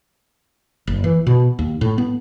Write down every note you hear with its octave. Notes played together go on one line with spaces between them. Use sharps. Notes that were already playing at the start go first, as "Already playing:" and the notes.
F#1
E3
B2
D#2
A2
B3